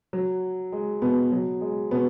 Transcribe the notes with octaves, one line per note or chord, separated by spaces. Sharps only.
F#3
G#3
B2 B3
F#3
G#3
B2 B3